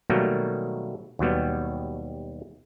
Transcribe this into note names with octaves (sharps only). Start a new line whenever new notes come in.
B2 D#3 F#3 G3 A3 A#3
D#2 B2 F#3 G3 B3